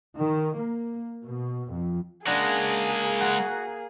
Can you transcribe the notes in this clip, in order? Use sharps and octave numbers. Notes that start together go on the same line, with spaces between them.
D#3
A#3
B2
F2
C#3 G#3 A#3 D4 G#4 F#5 A#5
F#4